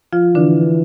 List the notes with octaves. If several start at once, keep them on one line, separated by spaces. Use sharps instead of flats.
F3 F4
D3 E3 D4